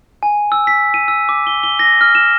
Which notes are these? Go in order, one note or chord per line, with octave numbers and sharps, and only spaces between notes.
G#5
E6
B6
D#7
E6
D6
G7
G7
A#6
F6
E7